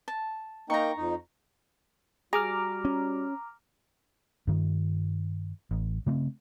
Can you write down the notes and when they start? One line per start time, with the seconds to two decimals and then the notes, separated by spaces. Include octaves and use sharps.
0.08 A5
0.70 A#3 D#4 G5 A#5 C#6
0.97 F2 D#4
2.33 G3 F#4 G#4 A#5 D6 F6
2.85 C#4
4.47 G2 D#3
5.71 A1
6.06 C#3 A3 C4